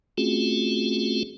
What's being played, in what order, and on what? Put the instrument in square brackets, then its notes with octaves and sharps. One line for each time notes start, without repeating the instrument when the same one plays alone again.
[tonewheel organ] A3 C4 C#4 F4 F#4 G#4